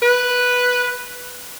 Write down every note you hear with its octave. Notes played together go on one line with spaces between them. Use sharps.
B4